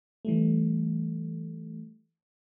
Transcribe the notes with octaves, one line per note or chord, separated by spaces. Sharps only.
E3 G3 A3